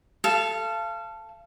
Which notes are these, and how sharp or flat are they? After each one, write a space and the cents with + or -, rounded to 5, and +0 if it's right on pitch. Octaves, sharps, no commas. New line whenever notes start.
A4 +0 F5 -35